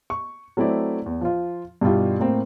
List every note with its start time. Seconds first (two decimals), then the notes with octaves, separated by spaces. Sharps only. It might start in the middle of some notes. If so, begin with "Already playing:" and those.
0.10 C#6
0.57 F#3 A3 C4 E4 D5
1.06 E2
1.21 F3 F4
1.81 G2 B2 G3 E4 F4 G4
2.20 A2 A#3 C4